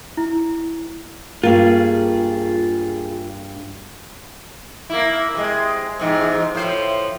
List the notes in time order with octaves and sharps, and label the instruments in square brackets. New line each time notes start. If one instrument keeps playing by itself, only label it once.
[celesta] E4
[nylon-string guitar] G2 A#3 [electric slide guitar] F4 G#4
[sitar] A#3 E4
C3 G#3
E2 G#2 C3
A2 F3 C5